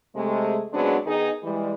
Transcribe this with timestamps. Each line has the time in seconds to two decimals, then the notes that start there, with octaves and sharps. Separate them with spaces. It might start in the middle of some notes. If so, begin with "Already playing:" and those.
0.15 C3 G#3 A3
0.72 C#3 F#3 G#3 B3 C4 D4
1.06 D#3 B3 D#4 G#4
1.43 E3 G3 G#3